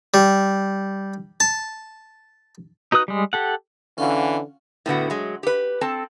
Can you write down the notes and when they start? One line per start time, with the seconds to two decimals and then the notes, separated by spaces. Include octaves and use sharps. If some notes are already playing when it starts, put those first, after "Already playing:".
0.14 G3
1.40 A5
2.92 D#4 F#4 B4 D#6 F#6
3.08 G3 G#3
3.33 G4 A4 F#5
3.98 D3 E3 C#4 F4 F#4
4.86 A2 D3 B3 F#4
5.10 F#3 G#3
5.43 G4 B4
5.81 C4 A4 A5